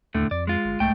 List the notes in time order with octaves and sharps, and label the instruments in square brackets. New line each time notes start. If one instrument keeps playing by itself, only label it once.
[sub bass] D#2 [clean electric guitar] A2 D3 A3
[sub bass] F2 [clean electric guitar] D5
[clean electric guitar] G#3 F4
[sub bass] G1
[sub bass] C2 [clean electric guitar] G#2 A3 G5